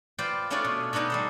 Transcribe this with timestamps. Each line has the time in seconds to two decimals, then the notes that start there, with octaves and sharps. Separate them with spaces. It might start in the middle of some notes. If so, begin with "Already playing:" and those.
0.18 F4 B4 C5 D5 G5
0.50 A3 C#4 D4 F4 G#4 D5
0.64 B2
0.93 B2 B3 D4 D#4 G#4
1.10 G3 A4 C5